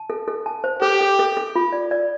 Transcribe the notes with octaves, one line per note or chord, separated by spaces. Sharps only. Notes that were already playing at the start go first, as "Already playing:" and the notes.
Already playing: A5
A4
A4
A5
C5
G4 A4
A4
A4
A4
F4
D5
D5